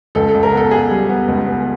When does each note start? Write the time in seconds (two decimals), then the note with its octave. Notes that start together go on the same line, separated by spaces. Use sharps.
0.15 C#2 A4
0.29 A4
0.34 C#2
0.43 A#4
0.52 B3 A4
0.71 B3 G#4
0.90 G3
1.09 B3
1.28 C#2
1.47 B3